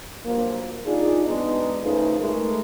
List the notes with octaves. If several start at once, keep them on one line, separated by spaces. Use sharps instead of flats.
G2 F3 F#3 A#3
A#3 D4 D#4 F4 G#4
B2 G#3 B3 D4 D#4 D#5
C#3 F3 A3 D#4 G#4 B4
G#3 A3 A#4